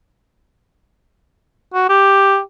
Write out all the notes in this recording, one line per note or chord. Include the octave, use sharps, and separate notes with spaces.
F#4
G4